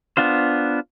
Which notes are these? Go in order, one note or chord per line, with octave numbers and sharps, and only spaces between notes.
B3 D4 F4 C5